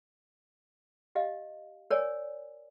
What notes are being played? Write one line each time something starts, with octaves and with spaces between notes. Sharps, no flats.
G4 D#5 F5
A#4 C#5 D5 G#5